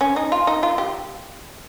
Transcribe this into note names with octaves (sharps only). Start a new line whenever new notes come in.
C#4
D#4
F4
D#4
F4
G4